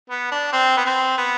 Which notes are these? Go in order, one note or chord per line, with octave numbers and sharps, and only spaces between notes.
B3
D4
C4
B3
C4
B3